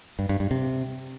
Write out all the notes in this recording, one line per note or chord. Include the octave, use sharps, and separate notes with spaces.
G2
G2
G2
C3